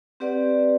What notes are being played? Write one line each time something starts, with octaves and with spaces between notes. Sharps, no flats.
C4 G4 B4 D5 F#5